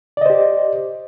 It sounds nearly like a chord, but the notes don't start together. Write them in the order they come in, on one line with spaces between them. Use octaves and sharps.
D5 D#5 C5 G4